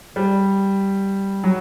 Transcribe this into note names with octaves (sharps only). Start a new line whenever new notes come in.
G3
F#3